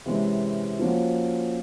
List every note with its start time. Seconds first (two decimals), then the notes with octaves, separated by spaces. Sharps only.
0.06 C3 E3 G#3 C#4
0.79 F3 A#3 C#4 F#4